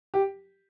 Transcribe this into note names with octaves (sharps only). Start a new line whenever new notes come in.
G4